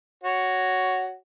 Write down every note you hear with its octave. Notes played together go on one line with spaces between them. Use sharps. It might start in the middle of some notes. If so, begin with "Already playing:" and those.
F#4 C#5